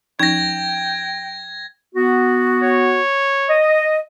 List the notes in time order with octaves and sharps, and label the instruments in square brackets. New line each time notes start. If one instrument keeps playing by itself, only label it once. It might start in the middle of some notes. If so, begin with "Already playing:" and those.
[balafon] F3 C#4 D#4 [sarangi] G5 [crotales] G#6 A#6
[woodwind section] B3 F#4
[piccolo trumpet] C#5
[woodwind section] D#5